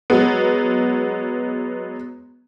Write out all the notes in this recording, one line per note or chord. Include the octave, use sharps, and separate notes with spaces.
F#3 G#3 B3